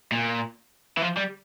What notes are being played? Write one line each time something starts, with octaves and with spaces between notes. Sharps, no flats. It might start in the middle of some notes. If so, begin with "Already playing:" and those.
A#2
E3
F3
G3